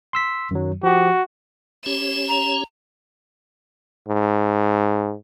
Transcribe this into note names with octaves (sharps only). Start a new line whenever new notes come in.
C6 E6 B6
F#2 D#3 F#3
F3 F#4 G4
C#4 G4 C#5 E7
A#5
G#2